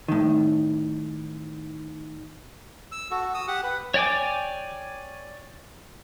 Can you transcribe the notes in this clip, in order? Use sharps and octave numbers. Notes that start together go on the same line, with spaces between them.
A2 D#3
E6
F#4 A4
D#6 E6
G4 F#5
B4
C#5 D5 G5 G#5 D6